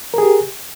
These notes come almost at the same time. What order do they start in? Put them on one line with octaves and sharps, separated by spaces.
A#4 G#4 G4